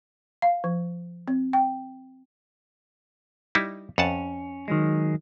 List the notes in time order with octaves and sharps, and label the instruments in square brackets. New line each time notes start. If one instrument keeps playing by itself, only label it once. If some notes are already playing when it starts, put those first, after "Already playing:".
[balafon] F5
F3
C4
G5
[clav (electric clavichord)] G3 D#4 E4
[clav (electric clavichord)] F2 F#5 A5 [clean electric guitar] C#4
[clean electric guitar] D#3 F#3 G#3